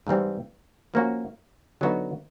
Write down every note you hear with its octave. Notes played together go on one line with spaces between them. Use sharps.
G#2 E3 G3 C4
F3 A#3 C#4 F#4
D3 F#3 B3 D#4 F#4